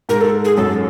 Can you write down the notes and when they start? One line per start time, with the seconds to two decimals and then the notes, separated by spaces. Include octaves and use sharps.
0.09 G#2 A#4
0.21 A4
0.45 G#4
0.57 F#2 A4